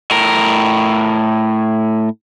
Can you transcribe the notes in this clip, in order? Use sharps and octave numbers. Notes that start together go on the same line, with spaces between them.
A2 A#4